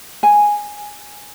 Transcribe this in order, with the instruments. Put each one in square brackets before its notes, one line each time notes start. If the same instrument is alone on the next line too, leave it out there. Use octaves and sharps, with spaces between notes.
[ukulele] G#5